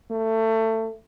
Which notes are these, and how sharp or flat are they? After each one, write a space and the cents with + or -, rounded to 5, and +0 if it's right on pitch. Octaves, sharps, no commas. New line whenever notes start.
A3 +25